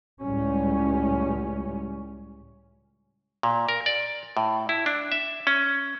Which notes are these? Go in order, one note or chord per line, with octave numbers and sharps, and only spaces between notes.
C#2 A2 G3 C#4
A#2
A#4
D5
A2
E4
D4
E5
C#4